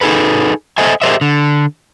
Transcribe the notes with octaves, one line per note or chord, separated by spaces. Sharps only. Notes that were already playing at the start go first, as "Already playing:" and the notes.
D#4 G#4 A4 B4
A4 C5 D#5 E5 G#5
G4 G#4 A#4 C5 D#5 E5
D3